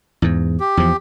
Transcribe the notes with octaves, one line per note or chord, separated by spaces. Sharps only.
E2 G#2
G4
E2 F3